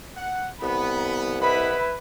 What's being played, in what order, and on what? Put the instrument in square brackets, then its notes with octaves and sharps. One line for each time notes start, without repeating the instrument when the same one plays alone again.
[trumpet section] F#5
[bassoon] C2 [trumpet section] B3 [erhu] B5
[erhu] E4 [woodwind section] B4 [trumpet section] D#5 F#5 B5